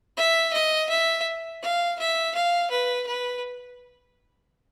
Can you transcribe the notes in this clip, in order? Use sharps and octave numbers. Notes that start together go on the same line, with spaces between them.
E5
D#5
E5
F5
E5
F5
B4
B4